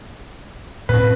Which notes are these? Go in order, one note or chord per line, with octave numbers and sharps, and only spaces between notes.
A2 C4 B4